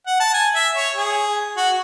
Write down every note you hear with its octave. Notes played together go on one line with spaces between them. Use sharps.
F#5
A5
G#5
E5
C#5
G#4
F#4